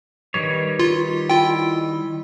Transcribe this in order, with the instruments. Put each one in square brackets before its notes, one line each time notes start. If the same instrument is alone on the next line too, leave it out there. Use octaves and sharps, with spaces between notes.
[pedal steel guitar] D#3 G3 C#5 [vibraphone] B4
[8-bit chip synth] F4
[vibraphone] E4 B5 [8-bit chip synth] F4 G5